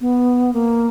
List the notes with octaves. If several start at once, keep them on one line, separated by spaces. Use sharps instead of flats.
B3
A#3